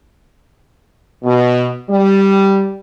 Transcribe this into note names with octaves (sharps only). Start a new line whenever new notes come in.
B2
G3